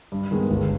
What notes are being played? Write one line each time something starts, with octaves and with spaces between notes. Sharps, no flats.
G2
D#3 G#3 B3
G1